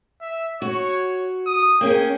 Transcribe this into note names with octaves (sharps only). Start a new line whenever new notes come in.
E5
F#4 C#5
D#6
A#3 C#4 G#4 G5